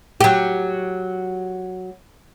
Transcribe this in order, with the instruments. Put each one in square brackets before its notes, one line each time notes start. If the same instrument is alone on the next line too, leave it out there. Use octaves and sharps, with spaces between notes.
[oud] F#3 G4